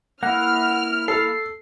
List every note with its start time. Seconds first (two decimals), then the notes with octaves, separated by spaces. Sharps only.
0.23 A#3 E4 F#5 F6
1.08 A4 C7